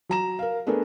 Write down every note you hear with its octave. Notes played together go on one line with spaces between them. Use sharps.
F#3 A#5 E7
A#4 F5
A3 B3 D4 G#4 A#4